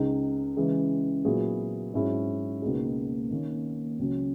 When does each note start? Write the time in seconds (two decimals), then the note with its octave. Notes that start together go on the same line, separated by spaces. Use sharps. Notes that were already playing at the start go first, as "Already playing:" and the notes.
Already playing: C#2 C#3 G#3 D#4 G#4
0.57 C#3 E3 G#3
1.24 A#2 F#3 B3 E4 G#4
1.94 G#2 F#3 C#4 E4 G#4
2.62 C#2 B2 A#3 D#4 G#4
3.30 D#3 A#3 C#4
3.99 C#2 C#3 F#3 C#4